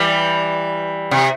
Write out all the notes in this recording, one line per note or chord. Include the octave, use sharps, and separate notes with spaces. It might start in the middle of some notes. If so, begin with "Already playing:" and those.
Already playing: E3 G3
C3